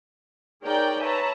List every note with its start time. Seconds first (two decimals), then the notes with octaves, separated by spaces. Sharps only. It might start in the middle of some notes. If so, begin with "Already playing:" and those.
0.62 D#4 G#4 A#4 C#5 D5 G5
1.01 B4 C#5 E5 A5 A#5